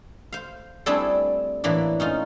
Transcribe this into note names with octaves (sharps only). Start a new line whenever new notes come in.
C5 F5
G3 A3 C4 D4 E4 G#4
A2 E3 A#3 D4
C#4 D#4 F4